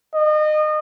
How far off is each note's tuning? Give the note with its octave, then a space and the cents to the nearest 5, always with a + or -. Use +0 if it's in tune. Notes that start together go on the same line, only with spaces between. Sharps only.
D#5 -30